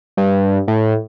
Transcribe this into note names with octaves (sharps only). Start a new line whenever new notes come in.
G2
A2